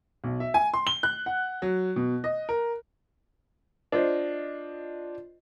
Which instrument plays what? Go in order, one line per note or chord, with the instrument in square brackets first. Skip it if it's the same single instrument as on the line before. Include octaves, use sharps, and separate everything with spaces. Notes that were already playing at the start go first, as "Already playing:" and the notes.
[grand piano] B1
E5
G#5
C6
G7
F#6
F#5
F#3
B2
D#5
A#4
[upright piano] D4 F4 C5 D#5